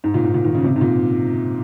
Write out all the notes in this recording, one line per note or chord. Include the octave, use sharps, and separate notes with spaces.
G#2
A#2
G#2
A#2
D#3
C#3
C3
G#2
A#2